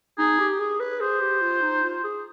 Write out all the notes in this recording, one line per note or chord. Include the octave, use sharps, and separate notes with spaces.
D#4 G#4
G4
G#4
B4
G#4 C5
G4
F4
D#4
F4
G#4